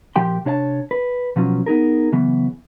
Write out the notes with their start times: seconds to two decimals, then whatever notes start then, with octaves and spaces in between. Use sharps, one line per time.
0.16 A#2 F3 G4 G5 C6
0.45 C3 D4 C#5 D5 A5
0.91 B4
1.36 B2 F3 F#3 C#4 F4
1.66 B3 D#4 G#4 A#4
2.12 C#3 E3 F#3 B3